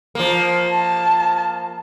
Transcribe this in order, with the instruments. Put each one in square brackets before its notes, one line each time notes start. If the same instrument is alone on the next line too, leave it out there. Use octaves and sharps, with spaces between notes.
[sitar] F3 A#3
[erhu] A5